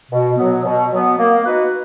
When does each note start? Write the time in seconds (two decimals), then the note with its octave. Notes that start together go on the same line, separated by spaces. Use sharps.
0.10 B2
0.37 F#3 B3
0.64 B2
0.91 F#3 B3
1.18 A#3
1.45 D#4 F#4 B4